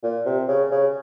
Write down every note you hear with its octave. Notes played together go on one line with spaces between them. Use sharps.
A#2
C3
C#3
C#3